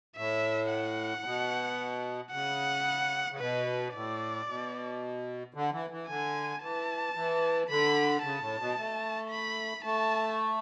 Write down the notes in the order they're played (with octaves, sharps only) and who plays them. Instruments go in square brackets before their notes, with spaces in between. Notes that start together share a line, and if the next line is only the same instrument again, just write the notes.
[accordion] A2 [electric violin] E5
[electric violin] F#5
[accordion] A2
B2
[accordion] C#3 [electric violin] F#5
[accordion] C#3
[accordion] B2 [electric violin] B4
[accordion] A2 [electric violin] D5
[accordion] B2
D3
E3
E3
[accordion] D3 [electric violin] G#5
[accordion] E3 [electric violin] A5
[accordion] E3
[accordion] D3 [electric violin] B5
[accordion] C#3 [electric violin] A5
[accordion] A2
B2
A3
[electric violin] B5
[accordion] A3 [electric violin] A5